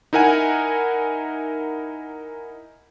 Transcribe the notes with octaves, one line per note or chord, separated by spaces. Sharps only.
D#4 E4 A#4 F#5 G#5